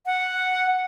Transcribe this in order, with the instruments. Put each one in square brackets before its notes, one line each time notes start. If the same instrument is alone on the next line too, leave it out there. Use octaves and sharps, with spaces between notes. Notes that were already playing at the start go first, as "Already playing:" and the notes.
[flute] F#5